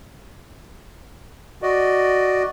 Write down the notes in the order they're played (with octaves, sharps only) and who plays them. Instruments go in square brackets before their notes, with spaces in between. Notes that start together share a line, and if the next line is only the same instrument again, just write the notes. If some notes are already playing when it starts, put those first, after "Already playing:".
[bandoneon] F#4 D5 D#5